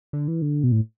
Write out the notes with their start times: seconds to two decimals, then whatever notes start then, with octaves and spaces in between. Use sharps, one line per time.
0.13 D3
0.28 E3
0.42 D3
0.64 B2
0.72 A2